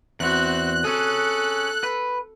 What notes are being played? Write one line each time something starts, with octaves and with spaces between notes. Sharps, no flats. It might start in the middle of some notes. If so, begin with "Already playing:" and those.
E2 C4 F#4 F#6
C#4 G#4 A4
B4